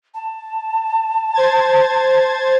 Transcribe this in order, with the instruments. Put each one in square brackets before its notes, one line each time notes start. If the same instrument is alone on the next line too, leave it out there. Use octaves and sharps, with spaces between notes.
[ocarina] A5
[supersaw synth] C5 G#6 A6